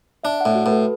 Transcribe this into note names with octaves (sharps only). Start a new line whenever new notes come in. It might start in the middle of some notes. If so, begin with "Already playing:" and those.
D4 E5
F#5
A2
F#4
A2 B4
A4